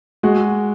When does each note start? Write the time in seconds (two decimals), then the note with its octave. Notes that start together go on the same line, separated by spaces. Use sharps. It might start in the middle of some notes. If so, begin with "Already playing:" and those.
0.23 G#3 F#4